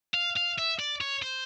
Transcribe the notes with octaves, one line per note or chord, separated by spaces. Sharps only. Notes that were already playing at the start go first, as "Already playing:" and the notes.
F5
F5
E5
D5
C#5
C5